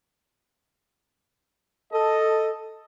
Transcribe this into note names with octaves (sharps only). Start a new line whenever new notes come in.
A4 D#5